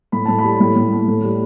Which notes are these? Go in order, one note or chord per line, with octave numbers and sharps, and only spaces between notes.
A2 B5
A2 A5
B5
G3
A2
A2
A3
A2
G3